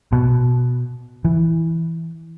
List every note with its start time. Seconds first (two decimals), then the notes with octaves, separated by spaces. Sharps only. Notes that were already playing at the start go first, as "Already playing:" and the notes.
0.12 B2
1.25 E3